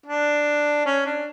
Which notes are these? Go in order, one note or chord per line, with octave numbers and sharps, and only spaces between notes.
D4
C#4
D4